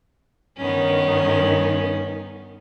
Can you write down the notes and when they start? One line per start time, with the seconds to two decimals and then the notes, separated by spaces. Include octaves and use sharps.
0.57 G2 D#3 B3 C#4